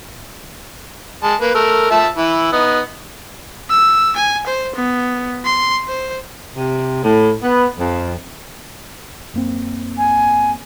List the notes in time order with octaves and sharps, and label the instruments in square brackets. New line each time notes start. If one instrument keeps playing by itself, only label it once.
[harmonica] G#3 A5
A#3 B4
A3 A#4
F3 E5 A5
E3 E4
B3 D#4
[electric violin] E6
G#5
C5
B3
C6
C5
[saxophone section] C3
A2
B3
F2
[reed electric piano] F#2 A#3 C4
[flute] G#5